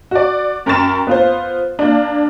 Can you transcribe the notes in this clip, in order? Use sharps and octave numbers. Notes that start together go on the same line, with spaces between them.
F#4 D5
F#2 A#4 G5 C#6 A6 E7
B3 F4 C5
A#3 D4